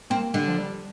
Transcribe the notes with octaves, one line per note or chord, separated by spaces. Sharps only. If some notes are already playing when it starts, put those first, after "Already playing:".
A#3 C4
D3 G3
F3
G3